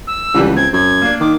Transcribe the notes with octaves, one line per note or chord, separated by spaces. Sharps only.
E6
C#2 D3 E3 G3
C4 G#6
F#2 G#6
A#3 D4
D#3 D6